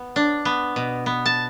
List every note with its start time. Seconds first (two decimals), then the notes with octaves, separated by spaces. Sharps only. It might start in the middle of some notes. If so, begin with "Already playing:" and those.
Already playing: B3
0.16 D4
0.45 B3
0.76 B2
1.06 B3
1.26 A5